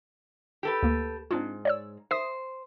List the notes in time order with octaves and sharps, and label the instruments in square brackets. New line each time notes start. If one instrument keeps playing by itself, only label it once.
[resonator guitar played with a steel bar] G4 A4 B4
[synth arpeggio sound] D2 A#3
[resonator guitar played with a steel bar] G#2 [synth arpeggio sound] C4 D4 F4
[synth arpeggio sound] C#5 D5 E6
[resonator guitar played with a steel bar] C5 [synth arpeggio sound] E5 D#6